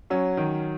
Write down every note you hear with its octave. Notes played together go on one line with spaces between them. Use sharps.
F#3 C#4
D#3